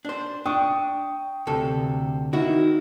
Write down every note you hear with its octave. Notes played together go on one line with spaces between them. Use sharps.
D4 C5
D4 G5 C#6 D#6
D2 C3 A4
D#3 D#4 E4 F#4